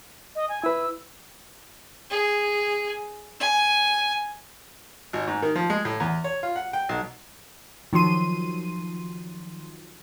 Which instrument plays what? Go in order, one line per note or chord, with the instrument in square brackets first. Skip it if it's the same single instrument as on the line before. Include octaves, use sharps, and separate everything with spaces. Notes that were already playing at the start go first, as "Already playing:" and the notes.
[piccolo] D#5
G#5
[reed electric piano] E4 B4 [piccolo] E6
[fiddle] G#4
G#5
[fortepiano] G#1
G#2
D#3
F3
G#3
A2
E2
C#5
F4
F#5
G5
B1
[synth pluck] D#3 F3 F#3 C6 D#7